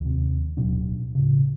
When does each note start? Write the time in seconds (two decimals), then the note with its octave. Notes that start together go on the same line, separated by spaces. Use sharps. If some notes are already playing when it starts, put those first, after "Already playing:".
0.01 D#2 C3
0.57 D1 B2 F#3 D4
1.15 A2 C#3